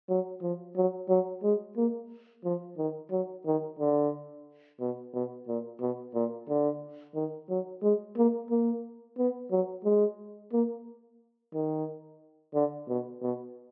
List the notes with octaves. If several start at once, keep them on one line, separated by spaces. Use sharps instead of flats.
F#3
F3
F#3
F#3
G#3
A#3
F3
D#3
F#3
D#3
D3
B2
B2
A#2
B2
A#2
D3
D#3
F#3
G#3
A#3
A#3
B3
F#3
G#3
A#3
D#3
D3
B2
B2